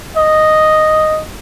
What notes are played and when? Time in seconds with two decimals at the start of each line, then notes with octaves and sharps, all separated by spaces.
0.17 D#5